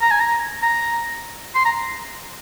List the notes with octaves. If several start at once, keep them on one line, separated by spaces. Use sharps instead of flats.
A#5
G#5
A#5
A#5
C6
A#5